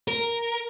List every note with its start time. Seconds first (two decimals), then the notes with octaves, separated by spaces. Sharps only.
0.08 A#4